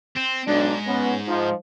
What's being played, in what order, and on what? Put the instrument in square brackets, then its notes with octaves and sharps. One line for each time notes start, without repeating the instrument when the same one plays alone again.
[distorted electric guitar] C4
[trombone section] B1 D4 [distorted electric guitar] G#2
[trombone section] B3 C#4
F3 D#4